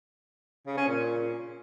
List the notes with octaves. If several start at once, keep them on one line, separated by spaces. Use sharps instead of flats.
C#3
C#4
A#2